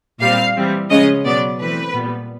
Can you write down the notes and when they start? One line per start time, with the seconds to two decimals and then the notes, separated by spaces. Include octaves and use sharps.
0.21 A#2 G3 C4 F5
0.56 E3 G3 C4
0.90 C#3 F3 G#3 C#4 D#5
1.25 B2 F#3 B3 D5
1.60 E3 A3 C4 B4
1.94 A#2 G3 B3